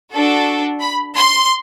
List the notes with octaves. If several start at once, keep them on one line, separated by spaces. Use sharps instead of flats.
D4 F#4 A4
B5
C6